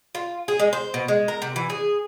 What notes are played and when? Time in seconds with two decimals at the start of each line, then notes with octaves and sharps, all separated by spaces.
0.15 F4
0.48 G#4
0.59 G#3
0.73 C5
0.94 B2
1.08 G#3
1.28 A#4
1.42 C3
1.56 E3
1.70 G#4